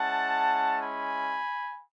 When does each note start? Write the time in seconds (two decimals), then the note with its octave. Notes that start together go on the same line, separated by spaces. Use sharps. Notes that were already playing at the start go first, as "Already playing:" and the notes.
Already playing: G#3 C#4 E4 F#5 A5
0.81 G#5 B5